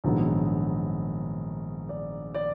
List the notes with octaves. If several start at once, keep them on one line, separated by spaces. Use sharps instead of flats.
A#1 G#2 D#3 F#3 B3
D5
D5